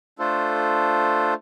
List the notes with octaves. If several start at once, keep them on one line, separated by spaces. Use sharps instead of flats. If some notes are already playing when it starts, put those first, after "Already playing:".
A3 D4 F4 A4 C5